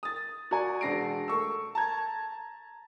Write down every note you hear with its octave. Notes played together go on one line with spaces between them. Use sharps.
D#6 A6
F#4 D5 G#5
E1 D4 A#6 C7 D7
A3 C#6 E6
A5 A#5 G#6